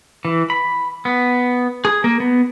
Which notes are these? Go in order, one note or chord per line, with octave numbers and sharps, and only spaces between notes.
E3
B5
B3
G#4
A#3
B3